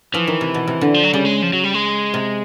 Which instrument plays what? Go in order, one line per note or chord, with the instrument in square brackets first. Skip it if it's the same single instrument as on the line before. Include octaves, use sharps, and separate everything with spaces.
[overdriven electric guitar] E3 [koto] F3
[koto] D#3
C3
B2
C3
D3
[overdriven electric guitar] F3
F#3
[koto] C#3 [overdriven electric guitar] G3
[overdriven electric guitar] G#3
F3
F#3
G3
G#3
[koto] C3